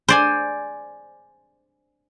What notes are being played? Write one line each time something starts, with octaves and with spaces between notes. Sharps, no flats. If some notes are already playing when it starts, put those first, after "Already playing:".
C5 D5 G#5